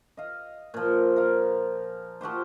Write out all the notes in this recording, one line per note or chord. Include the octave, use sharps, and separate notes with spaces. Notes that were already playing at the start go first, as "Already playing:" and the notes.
D#5 F5
A#2 F3
A#4 F5
F3 F#4 G4 C5